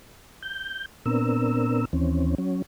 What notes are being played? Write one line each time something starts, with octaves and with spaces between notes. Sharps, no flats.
G6
A#2 B3 C4 D4 A#4 E6
D#2 E3 C4 C#4
F#3 C#4